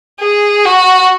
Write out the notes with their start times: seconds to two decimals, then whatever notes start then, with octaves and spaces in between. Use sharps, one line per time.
0.20 G#4
0.65 F#4